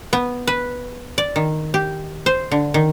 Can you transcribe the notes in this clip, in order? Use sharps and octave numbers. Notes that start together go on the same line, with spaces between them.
B3
B4
D5
D#3
G4
C5
D3
D#3